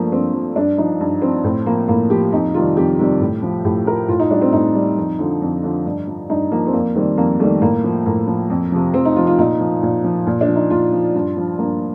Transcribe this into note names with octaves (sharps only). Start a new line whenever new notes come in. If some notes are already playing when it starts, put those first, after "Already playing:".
Already playing: G2 F3 A3 A#3
G2 C4
F3
G2 D4
F3 D#4
G2
F3 C4
A2 C4
F3 A#3
A2 A#3
F3 G4
F2 D#4
C3 D#3 G3 F4
F2 G4
C3 D#3 G3
A2
F3
A2 G4
F3 A#4
A2 F4
D#4
G3 D4
C4
A2 D#4
G3
F2
D3 F3
F2
D3 F3
G2
F3
G2 D#4
F3 A#3
C4
F2 A#3
D#3 G3 C4
F2 A#3
D#3 G3 A3
A2 A#3
F3
A2 A#3
F3
F2
C3 F3
F2 C4
D#4
C3 F3 F4
F4
A#2 D#4
F3
A#2
F3
A#2
D4
F3
D#4
A#2 F4
F3
G2
F3
G2 A#3